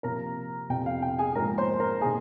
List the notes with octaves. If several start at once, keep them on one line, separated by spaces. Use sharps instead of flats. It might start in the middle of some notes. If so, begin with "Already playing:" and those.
C3 F3 A#3 A#4 A#5
F2 C3 F3 G5
F5
G5
G#4 G#5
G#2 F3 A#3 A#4 A#5
C5 C6
A#4 A#5
C3 D#3 A#3 G#4 G#5